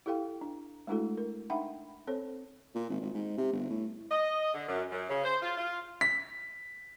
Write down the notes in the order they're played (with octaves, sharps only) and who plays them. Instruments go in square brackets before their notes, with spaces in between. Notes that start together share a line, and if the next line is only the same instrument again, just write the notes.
[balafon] E4 G4 A4 F5 G5
D4
G#3 A3 D4 E4 F#4 A4
A#4
D4 D#4 E5 F#5 G5 B5
C4 A4 C5 C#5
[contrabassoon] A#2
G#1
G#1
G#2
C3
G1
A2
[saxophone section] D#5
D3
F#2
F#2
C#3
C5
F4
F4
[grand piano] B6